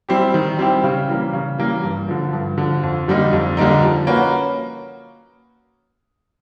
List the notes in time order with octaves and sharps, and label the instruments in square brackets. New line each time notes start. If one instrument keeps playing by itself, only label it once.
[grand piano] G3 C4 E4 G4
D#3
G3 C4 E4 G4
C#3
E3 G3 A#3
C#3
E3 G3 A#3
G2
D3 F3
G2
D3 F3
F2
D3 G3 A#3 D#4
F2
D3 G3 A#3 D#4
F3
A#3 C#4 F#4 B4